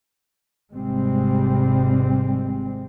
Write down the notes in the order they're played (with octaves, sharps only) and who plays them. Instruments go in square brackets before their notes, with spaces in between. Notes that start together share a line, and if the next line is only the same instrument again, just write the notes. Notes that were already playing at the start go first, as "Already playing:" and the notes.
[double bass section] G#1 C3 G3 G#3 C4